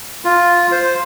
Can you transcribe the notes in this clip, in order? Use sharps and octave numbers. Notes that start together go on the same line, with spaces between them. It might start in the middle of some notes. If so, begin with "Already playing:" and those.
F4
C5